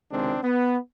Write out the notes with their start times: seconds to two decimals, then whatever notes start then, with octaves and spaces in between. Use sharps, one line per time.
0.11 C#2 C3 D#3 G#3 C4 D4
0.43 B3